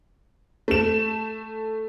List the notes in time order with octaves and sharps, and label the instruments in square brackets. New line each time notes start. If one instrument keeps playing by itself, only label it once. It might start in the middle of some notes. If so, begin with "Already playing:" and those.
[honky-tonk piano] A3 E7